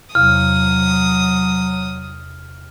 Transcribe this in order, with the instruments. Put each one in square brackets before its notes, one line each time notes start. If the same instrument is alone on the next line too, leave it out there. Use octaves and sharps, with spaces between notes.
[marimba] E2 C3 F5 [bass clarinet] F#3 [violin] D#6 [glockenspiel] F6